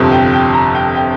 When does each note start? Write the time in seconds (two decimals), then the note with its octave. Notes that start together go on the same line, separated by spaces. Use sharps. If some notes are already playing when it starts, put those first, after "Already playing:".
Already playing: G1 F2 C3 F3
0.12 G5
0.33 G5
0.54 A#5
0.75 G5
0.95 G5